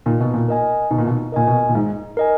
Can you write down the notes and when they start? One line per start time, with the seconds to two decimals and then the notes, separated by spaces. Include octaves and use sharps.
0.06 A#2 D#4
0.20 B2
0.34 A#2
0.48 A#4 D#5 G#5
0.91 B2 D#4
0.98 A#2
1.06 B2
1.32 A#2 A#4 D#5 G#5
1.47 B2
1.69 A#2
1.75 G#2 D#4
2.17 A#4 D#5 G#5